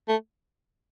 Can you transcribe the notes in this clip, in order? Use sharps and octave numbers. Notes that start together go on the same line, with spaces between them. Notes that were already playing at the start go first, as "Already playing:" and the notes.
A3